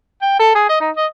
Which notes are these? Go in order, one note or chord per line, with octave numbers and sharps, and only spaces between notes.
G5
A4
G#4
D#5
D#4
D#5